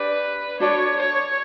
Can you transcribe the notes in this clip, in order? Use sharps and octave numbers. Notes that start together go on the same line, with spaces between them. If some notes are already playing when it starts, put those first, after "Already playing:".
Already playing: D4 G4 B4 D5
D4 F#4 A4 C#5 D5
C#5